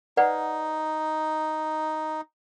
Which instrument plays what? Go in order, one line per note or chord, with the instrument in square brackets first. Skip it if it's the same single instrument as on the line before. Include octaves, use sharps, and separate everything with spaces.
[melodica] D#4 [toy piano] B4 D5 F#5